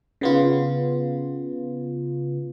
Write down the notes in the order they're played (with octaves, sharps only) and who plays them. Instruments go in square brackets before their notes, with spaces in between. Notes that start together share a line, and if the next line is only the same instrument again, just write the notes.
[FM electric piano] C#3 B3 F4